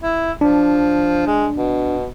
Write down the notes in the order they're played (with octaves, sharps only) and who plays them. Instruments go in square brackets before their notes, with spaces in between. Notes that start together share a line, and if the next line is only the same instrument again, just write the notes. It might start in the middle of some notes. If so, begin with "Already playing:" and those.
[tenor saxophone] E4
[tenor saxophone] F3 [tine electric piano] D4
[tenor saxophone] G#3
B2